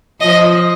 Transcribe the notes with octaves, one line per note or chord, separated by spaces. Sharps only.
F3 D#5